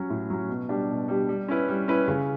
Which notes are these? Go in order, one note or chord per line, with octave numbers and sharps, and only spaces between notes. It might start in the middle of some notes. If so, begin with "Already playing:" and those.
Already playing: F#3 C#4
A2
F#3 C#4
B2
G3 D4 G4
B2
G3 D4 G4
G3
C#4 E4 B4
G3
C#4 E4 B4
C#3